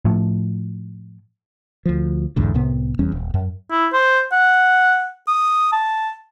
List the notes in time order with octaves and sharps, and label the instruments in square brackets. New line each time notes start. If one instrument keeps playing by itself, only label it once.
[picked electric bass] A2 F3
[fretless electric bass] D2 F3
B1 E2 G#2 D3
C2 A2 C3 B3
E1 E2 G3 C#4
D#1
F#2
[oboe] E4
C5
F#5
D#6
A5